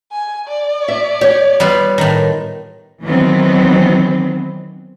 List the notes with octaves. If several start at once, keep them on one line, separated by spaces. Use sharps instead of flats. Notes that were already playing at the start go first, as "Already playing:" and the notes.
G#5
D5
E5
G4 C#5
G3 B3 F4
A2 D#3
D#3 E3 F#3 B3 C4